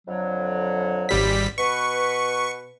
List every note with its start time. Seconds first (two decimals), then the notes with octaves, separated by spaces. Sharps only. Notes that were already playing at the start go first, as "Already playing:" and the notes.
0.07 F2 D3 F#3
1.09 G#1 G3 B6
1.58 B2 B4 C#6